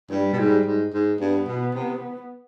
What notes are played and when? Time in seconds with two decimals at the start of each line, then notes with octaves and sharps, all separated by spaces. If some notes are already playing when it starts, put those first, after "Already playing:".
0.11 G2 G3
0.33 B2
0.39 G#2
0.66 G#2
0.94 G#2
1.20 G2 B3
1.48 B2
1.75 C3